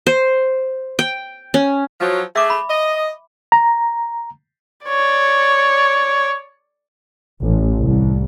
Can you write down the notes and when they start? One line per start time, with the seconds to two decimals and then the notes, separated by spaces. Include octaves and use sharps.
0.07 C5
0.99 G5
1.54 C#4
2.01 F3 F#3
2.36 A3 G#4 E5 D6
2.50 B5
2.69 D#5
3.52 A#5
4.86 C#5 D5
7.43 A1
7.82 C2